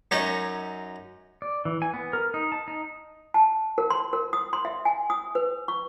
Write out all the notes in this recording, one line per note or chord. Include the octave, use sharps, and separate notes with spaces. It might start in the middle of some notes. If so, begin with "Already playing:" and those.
F#2 C#4 D#4 C#5 G#5 C#6
D5
E3
G#5
B3
A#4
D#4
A5
D#4
A5
A#4
C6
A#4
D#6
C6
E5
G#5
D#6
B4
C#6